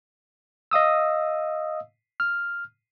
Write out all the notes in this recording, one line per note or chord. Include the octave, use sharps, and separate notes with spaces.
D#5 F5 D#6 E6
F6